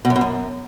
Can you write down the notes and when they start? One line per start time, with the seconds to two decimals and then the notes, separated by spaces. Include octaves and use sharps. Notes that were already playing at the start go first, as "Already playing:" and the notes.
0.05 B2
0.10 F#2
0.16 B2
0.21 F#2